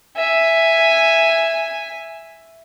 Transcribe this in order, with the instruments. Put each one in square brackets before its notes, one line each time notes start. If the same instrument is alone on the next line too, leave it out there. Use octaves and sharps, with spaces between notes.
[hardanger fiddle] E5 G#5